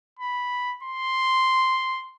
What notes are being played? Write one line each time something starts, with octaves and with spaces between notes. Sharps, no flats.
B5
C6